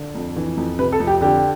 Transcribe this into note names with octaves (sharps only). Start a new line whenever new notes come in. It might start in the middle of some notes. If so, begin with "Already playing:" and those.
Already playing: D3
F2
E3
F2
C3 B4
A4
F2
G4
D3 G4